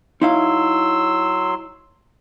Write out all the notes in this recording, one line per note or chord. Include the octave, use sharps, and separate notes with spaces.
F#3 D#4 E4 F5 C6 E6